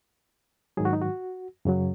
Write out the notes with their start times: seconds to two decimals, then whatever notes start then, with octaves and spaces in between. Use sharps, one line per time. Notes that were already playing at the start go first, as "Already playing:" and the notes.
0.77 G#2 D#3 F#3 G#4
0.85 F#4
0.93 D#4
1.02 F#4
1.65 F#2 C#3 F#3